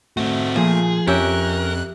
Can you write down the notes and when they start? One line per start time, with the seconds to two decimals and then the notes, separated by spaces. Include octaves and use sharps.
0.17 A3 C4 F#4
0.56 A#2 F3 G#4
1.07 F2 C#4 G4 A#4 E5 G5 F#6